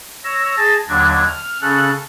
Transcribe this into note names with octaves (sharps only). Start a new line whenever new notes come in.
C#5 E6 A#6
G#4 A5 A6 A#6
D#2 D3 F#3 D4 G#6
F6
C#3 C#4 A4 F#6